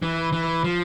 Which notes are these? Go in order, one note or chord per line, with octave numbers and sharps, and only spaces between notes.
E3
E3
F3